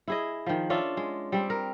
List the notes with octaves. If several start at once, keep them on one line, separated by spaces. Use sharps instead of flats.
E4 G#4 D#5
D#3 F3
C#4 D4 F4 E5
G#3
G3 C4
A#4